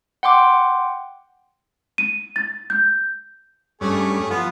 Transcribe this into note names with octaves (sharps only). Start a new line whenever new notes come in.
F#5 G5 C6 D6
D#7
A6
G6
G2 A3 C#4 G#4
F3 B3